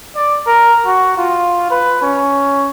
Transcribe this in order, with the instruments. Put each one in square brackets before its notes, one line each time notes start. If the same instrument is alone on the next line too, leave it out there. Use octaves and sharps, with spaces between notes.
[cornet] D5
A#4
F#4
F4
B4
C#4